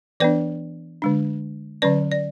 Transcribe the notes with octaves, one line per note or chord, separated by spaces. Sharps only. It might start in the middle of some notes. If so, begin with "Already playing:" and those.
E3 B3 D4 B4 D5
D3 G#3 D4
D3 F#3 C#4 B4 D5
D5